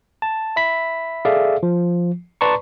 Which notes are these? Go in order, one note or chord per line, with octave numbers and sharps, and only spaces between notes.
A5
E5 B5 B6
G#4 A4 D5 E5 F5
F3
B4 D5 A5 A#5 C6 C#6